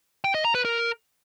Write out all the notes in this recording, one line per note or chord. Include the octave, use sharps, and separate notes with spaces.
G5
D#5
A#5
B4
A#4